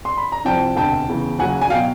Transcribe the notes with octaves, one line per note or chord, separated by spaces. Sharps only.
C6
B5
A#5
C2 C3 F3 G5 A5
E1 D2 C3 G5 A5
E2 C#3 E3
D#2 C#3 F#3 F#5 G#5
G#5
B2 F#3 F5 G5